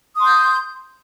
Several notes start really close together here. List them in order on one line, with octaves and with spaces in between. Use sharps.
D#6 C6 G6